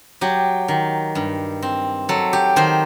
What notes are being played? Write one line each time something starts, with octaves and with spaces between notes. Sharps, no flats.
F#3 G4
D#3
G2
C4
F#3 A4
G4
D#3 C5